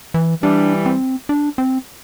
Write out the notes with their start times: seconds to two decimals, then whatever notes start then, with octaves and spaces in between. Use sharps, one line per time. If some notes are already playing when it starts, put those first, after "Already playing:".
0.14 E3
0.43 E3 G3 D4
0.86 C4
1.29 D4
1.58 C4